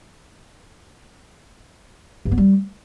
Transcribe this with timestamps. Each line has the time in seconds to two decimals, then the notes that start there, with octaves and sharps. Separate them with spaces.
2.25 G2
2.32 B3
2.38 G3